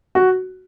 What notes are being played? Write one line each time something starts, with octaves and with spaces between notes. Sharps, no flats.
F#4